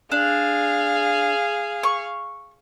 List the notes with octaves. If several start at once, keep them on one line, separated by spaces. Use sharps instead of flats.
D4 G#4 F5
C#6